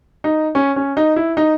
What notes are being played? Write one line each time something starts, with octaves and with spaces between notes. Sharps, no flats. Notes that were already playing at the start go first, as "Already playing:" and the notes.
D#4
C#4
C#4
D#4
E4
D#4